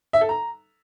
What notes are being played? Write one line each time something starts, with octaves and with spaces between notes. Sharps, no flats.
E5
A4
A#5